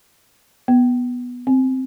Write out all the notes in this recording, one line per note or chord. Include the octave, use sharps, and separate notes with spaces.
B3
C4